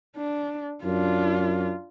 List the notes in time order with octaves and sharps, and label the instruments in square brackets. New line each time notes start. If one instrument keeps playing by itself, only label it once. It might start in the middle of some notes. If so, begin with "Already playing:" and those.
[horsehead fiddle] D4
[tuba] F#2 [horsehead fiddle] D4 F4